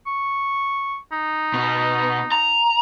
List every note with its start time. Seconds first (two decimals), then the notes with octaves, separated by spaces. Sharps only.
0.07 C#6
1.12 D#4
1.54 B2
2.32 A#5